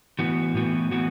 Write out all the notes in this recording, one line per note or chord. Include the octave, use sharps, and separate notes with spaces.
A2 E3 B3 F#4
A2 E3 B3 F#4
A2 E3 B3 F#4